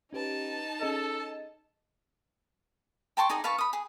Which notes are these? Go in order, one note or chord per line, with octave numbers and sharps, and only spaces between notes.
C#4 D#4 G4 B4 A5
C#4 G#4 A4 D#5
G5 A5 C6 C#6
D#4 G#4 D5 D#5
B4 F5 A5 C#6
B5 D#6
G#4